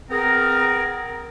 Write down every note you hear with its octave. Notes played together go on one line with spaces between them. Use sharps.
B3 C4 G#4 A#4